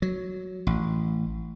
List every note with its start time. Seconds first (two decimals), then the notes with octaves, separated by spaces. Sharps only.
0.02 F#3
0.67 A1